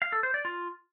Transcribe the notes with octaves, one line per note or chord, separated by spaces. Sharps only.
F5
A4
C5
D5
F4